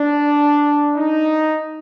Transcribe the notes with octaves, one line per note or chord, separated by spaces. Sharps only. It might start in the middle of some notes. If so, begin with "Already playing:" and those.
Already playing: D4
D#4